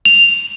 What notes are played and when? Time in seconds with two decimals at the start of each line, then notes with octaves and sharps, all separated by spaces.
0.05 F7